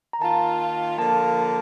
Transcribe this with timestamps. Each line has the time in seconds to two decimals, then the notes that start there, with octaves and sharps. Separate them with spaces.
0.13 A#5
0.21 D#3 A#3 F4 A5
0.98 D3 F3 A#3 A5